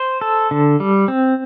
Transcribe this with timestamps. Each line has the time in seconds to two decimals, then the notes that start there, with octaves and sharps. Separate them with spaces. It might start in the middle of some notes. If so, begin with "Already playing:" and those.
Already playing: C5
0.21 A4
0.51 D3
0.80 G3
1.08 C4